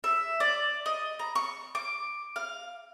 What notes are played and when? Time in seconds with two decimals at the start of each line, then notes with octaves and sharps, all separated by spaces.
0.04 E5
0.40 D5
0.86 D#5
1.19 A#5
1.36 C#6
1.75 D6
2.36 F5